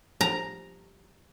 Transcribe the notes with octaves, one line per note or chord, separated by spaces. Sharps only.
A#5